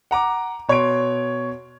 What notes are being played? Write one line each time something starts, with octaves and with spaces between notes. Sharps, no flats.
F#5 A#5 D6
B2 C#5 C6 G#6 D7